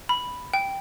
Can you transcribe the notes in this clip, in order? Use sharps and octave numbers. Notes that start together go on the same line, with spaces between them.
B5
G5